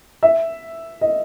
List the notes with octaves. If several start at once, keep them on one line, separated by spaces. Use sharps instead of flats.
E5
D#5